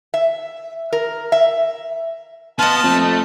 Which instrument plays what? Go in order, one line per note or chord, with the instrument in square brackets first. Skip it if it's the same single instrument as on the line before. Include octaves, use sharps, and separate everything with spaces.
[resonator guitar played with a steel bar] E5
A#4
E5
[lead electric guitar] B3 [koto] F4 D#5 [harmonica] A5
[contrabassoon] F2 [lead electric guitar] A3